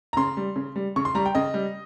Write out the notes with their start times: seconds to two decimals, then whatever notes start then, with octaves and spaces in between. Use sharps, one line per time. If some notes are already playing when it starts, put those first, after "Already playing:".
0.13 A#5
0.17 C#3 C6
0.37 G3
0.56 C#3
0.76 G3
0.96 C#3 C#6
1.05 C6
1.15 G3 A#5
1.26 G5
1.35 C#3 D#5
1.54 G3